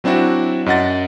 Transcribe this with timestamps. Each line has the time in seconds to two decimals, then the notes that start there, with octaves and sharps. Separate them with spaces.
0.04 F#3 C4 D4 E4 F#4
0.66 F#2 D#5 F#5 A6